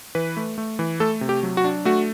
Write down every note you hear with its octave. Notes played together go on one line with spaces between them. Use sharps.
E3 B4
A3
A3
E3
A3 A4
C3
G4
F#3
F#4
D4
A3 F#4